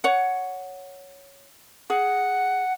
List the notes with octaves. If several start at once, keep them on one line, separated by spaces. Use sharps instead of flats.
C#5 F#5
G#4 F#5